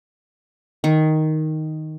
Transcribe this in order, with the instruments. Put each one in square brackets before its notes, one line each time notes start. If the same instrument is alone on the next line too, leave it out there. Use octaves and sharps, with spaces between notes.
[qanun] D#3